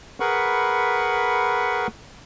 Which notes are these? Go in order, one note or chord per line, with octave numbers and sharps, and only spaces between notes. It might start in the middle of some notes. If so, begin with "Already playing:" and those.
G#4 A#4 B4 F#5 B5 C#6